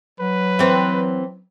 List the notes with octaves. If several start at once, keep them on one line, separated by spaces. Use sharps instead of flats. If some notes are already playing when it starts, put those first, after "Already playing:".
F#3 B4
E3 C4